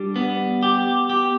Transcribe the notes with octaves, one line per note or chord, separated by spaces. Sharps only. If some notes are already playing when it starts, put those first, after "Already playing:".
Already playing: G3 D4
B3
G4
G4